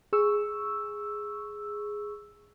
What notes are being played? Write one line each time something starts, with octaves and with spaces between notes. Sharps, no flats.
G#4 C#6 E6